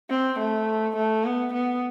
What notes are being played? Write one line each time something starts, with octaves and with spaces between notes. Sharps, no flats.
C4
A3
A3
B3
B3